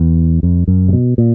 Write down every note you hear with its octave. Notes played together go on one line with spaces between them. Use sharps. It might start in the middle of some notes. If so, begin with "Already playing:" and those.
Already playing: E2
F2
F#2
C3
B2
A#2